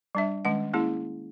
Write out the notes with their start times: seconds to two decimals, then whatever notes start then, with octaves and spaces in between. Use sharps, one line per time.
0.15 G3 D4 E5
0.45 D#3 G#3 C#4 F#5
0.74 A#3 C#4 E4 G#4